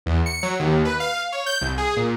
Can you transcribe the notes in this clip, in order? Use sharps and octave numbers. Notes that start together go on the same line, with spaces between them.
E2
C#7
F#3
D#2
B4
F5
C#5
G6
C2
G#4
A#2